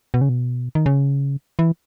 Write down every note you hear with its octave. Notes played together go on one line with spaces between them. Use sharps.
B2
C#3
B2
D#3
C#3
E3